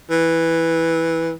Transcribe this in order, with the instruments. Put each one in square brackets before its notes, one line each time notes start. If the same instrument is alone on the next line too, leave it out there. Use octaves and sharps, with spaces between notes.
[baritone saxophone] E3